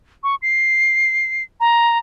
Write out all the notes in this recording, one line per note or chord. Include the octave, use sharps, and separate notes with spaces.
C#6
C7
A#5